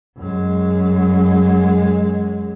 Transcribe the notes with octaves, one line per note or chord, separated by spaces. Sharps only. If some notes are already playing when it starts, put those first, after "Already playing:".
F#2 G#3